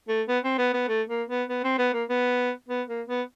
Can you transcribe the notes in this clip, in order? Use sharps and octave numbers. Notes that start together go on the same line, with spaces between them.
A3
B3
C4
B3
B3
A3
A#3
B3
B3
C4
B3
A#3
B3
B3
A#3
B3